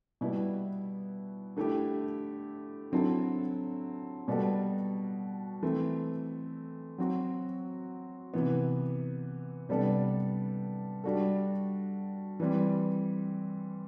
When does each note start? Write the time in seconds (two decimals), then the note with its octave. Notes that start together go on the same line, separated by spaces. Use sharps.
0.21 B2 G3 B3 E4
1.57 D3 A3 E4 G4
2.92 D3 F#3 C4 E4 A4
4.28 B2 G3 B3 F#4 A4
5.62 E3 A3 C4
6.98 F#3 C4 F#4
8.34 C3 E3 B3
9.69 C3 G3 B3 D4 A4
11.04 G3 D4 F#4 A4
12.40 E3 G3 C4